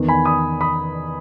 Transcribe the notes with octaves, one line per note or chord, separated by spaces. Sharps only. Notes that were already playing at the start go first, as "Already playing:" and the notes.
Already playing: E2 D#3
G#5 B5
B5 D#6
B5 D#6